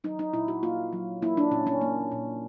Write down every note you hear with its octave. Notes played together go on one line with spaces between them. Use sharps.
F#3 D#4
D#4
A#2 E4
F#4
A#3 F4
F#3
A#3 E4
D4
A#2 C#4
C#4
A#3
A#2